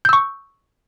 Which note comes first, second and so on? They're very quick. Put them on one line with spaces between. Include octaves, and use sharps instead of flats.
G6 E6 C#6